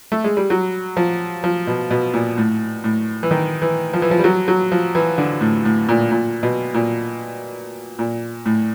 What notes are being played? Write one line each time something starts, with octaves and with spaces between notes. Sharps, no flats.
A3
G#3
G3
F#3
F3
F3
B2
B2
A#2
A2
A2
E3
D#3
E3
F3
E3
F3
G3
F#3
F#3
F3
E3
D3
A2
A2
A#2
A#2
B2
A#2
A#2
A2